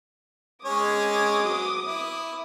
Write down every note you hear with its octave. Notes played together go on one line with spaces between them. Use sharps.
G#3 C#4 C#5 D6 D#6
F#3
E4